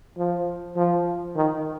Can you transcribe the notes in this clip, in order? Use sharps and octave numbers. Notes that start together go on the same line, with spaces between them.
F3
F3
D#3